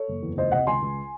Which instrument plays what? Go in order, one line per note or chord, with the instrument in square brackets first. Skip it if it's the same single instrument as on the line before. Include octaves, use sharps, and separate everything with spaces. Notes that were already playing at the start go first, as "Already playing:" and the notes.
Already playing: [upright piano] A4 C#5
F#1
E2
C#2 C5 D#5
C3 D#5 F#5
C#2 G#5 C6
C#2